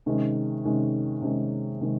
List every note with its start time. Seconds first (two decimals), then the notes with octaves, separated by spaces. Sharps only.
0.06 C3 D#3 G#3 C#4
0.64 C3 D#3 G#3 C#4
1.22 C3 D#3 G#3 C#4
1.81 C3 D#3 G#3